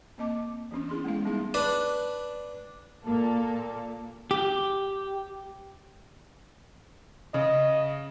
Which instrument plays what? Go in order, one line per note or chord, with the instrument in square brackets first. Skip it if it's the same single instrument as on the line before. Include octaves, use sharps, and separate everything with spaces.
[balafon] A#3 C4 D#5 A5 D6
E3 B3 C#4 D4
E4 G#4 C6
G#3 A3 B3 F5
G3 B3 D#4 G#4 F5
[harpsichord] D4 B4
[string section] A#2 A#3 A4
[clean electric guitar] G4
[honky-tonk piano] C#3 [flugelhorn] D#5